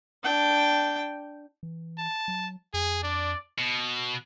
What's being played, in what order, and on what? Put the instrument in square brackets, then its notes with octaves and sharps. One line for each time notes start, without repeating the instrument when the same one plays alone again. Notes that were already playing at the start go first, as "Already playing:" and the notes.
[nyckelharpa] D4 G5
[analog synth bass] E3
[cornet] A5
[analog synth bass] F#3
[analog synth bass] F2 [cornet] G#4
[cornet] D4 [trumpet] D5
[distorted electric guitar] B2